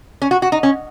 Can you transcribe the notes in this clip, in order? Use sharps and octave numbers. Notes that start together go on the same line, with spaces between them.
C#4
F#4
F#4
D#4
C#4